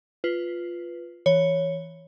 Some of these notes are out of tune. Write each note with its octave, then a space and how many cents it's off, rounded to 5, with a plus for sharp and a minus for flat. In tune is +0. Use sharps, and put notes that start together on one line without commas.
F4 +0 B4 +0
E3 +0 C#5 +0